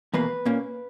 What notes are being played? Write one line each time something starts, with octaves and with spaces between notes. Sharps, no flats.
E2 B2 A#3 B4
A#2 A#3 C#4